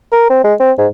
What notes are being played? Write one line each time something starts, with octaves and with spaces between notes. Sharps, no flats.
A#4
C4
G#3
C4
G#2